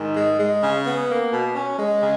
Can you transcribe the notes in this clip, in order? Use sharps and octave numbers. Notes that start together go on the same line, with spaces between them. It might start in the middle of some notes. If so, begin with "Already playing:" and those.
Already playing: G#2 D#3
G#3
G#3
C#3
B3
A#3
B2
C#4
G#3
C#3